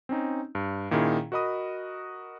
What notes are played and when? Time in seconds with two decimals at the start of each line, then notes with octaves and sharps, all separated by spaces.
0.09 C4 C#4 D#4
0.55 G2
0.91 A#2 D#3 C#4 E4 G#4
1.32 F#4 A#4 D#5 B5 D#6